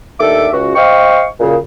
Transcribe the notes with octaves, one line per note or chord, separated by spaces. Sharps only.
D#2 D4 A4 E5 D6
C#2 F#4
C5 D#5 F5 G5 C#6
F#2 A#2 C#3